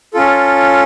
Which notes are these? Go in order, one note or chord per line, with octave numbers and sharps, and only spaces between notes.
C#4 F4 A4